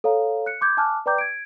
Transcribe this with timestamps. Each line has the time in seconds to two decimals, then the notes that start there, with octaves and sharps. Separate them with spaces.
0.04 A4 C#5 F5 A#5
0.46 F#6 C#7
0.61 C6 D6 G6 G#6
0.77 G#5 A5 D6 F6 F#6
1.06 B4 D5 G5 A#5 D6 G6
1.18 G#6 D7